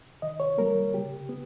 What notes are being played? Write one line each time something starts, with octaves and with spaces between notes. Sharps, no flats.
D#3 D#5
C#5
G3 A#3 A#4
C#3 G4
B3